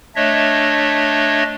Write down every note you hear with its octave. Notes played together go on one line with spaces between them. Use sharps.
A3 D4 C#5 D#5 E5